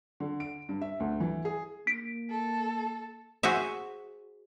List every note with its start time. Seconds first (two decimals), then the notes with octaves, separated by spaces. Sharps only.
0.20 D3
0.40 D7
0.69 G2
0.81 E5
1.00 D2
1.20 E3
1.45 G#4
1.87 A#3 B6 D7
2.30 A4
3.43 F#4 G#4 C5 E5